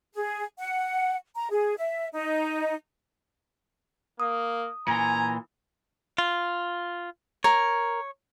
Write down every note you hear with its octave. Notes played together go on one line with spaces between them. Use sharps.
G#4
F#5
A#5
G#4
E5
D#4
A#3 D#6
A#2 E3 G#5 A#5
F4
A#4 C#5